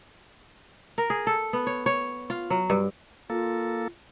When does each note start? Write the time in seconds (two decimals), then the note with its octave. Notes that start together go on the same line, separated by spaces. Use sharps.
0.98 A#4
1.10 G#4
1.27 A4
1.53 B3
1.67 C#5
1.86 C#5
2.30 F4
2.50 F#3
2.70 G2
3.30 A#3 F4 A4